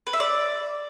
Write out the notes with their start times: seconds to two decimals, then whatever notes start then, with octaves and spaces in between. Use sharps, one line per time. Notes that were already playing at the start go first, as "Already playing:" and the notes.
0.07 B4
0.13 E5
0.20 D5